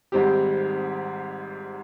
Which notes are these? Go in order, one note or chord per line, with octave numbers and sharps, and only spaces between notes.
G#1 G#2 G3 C4 G4